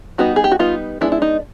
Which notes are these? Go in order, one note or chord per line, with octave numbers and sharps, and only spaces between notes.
G3 B3 D#4 F#4
G#4
G4
F#4
G3 B3 D#4 F4
G#3 B3 D4 E4
E4
D#4